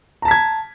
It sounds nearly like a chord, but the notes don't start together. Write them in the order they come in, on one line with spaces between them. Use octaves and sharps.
A#5 A5 B6 G#6